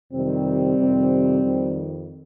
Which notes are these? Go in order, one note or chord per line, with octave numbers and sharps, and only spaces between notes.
F2 C3 D#3 G3 C4
F2 C3 D#3
F2 D#3